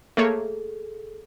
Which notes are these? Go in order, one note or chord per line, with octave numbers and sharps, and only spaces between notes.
A3 A#3 G#4 A4 C#5